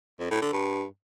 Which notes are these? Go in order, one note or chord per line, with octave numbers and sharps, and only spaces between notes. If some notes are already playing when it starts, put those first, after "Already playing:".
F2
A2
D3
G2